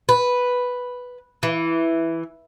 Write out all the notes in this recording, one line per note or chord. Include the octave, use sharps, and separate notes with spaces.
B4
E3